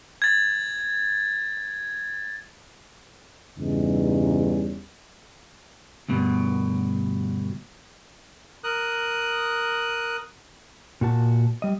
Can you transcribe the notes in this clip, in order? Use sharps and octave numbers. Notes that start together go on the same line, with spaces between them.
G#6 A6
E2 G2 C#3 G3 C#4 D#4
D2 G2 B2
A#4 D#6 F#6
A#2 F#4 A5
G3 D#5